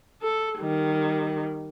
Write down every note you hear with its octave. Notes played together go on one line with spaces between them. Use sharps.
A4
D#3 G3